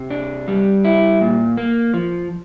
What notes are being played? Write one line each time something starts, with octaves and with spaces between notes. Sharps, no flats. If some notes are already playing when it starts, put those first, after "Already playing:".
Already playing: C3
D4
G3
E4
A#2
A#3
F3